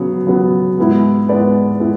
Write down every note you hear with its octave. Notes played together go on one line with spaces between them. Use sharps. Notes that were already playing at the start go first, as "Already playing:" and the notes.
Already playing: C#3 F#3 B3
C#3 F#3 B3
G#2 G#3 B3 E4
G#2 G#3 B3 E4 B4 D5
G#3 B3 E4